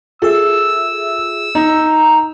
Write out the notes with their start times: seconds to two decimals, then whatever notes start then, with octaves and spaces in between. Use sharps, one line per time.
0.22 F4 G#4 A4 E5 E6
1.55 D#4 A#5